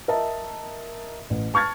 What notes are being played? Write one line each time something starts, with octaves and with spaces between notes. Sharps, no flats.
A#4 D#5 E5 A5
A1
A5 C#6 F6 G#6 A6